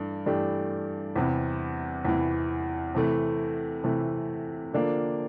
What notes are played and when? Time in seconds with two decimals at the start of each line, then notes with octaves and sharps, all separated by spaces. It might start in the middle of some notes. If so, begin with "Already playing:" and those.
Already playing: G2 E3 A3 D4
0.26 G2 E3 A3 D4 G4
1.16 E2 C3 E3
2.05 E2 C3 E3
2.95 C3 E3 A3
3.84 C3 E3 A3
4.74 D3 F3 A#3 D4